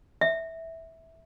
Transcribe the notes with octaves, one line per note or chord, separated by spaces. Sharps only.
E5